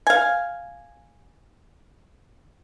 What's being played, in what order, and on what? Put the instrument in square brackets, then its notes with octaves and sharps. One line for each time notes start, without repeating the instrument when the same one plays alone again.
[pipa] F5 G#5